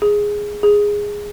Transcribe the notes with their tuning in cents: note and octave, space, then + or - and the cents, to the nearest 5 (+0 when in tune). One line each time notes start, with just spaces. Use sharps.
G#4 -5
G#4 -10